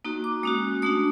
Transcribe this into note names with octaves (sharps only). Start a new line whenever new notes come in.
A#3 D#4 F#4
D6
G#3 C#4 F#4 D#6
A3 D4 F#4 D#6